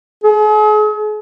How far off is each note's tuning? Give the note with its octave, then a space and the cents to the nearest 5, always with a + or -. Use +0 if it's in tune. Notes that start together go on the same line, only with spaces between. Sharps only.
G#4 +40